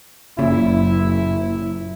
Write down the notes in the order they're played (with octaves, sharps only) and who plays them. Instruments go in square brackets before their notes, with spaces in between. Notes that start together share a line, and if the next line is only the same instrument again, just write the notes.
[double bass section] F#1 F#2 [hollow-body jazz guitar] A#2 [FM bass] C#3 [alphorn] E4